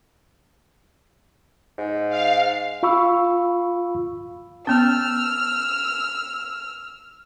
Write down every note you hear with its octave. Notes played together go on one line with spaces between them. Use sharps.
G#2
F5
F4 F5 B5 C#6 E6
B3 C#4 E6 F6